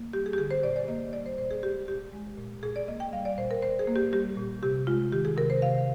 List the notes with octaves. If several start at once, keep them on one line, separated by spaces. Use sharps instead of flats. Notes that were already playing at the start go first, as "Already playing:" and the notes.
Already playing: A#3
G3 G4
G#4
G4
D3 G#4
C5
A#2 D5
D5
A#3 D#5
G3 D5
C5
A#2 C5
G#4
G#3 G4
A#2 G4
G#3
A#2
A#2 G#4
D5
A#3 D#5
G5
G3 F5
D5
A#2 C5
A#4
A#2 C5
G#4
A#3
G4
G3 G4
A#2
C3 G4
G#3 F4
D#3 G4
G#4
C3 A#4
C5
C3 F5